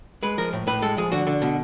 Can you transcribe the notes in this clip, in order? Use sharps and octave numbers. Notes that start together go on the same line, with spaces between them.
G#3 B4
F3 A#4
A2
A2 B4
G#3 A4
F3 G#4
D3 F#4
D3
B2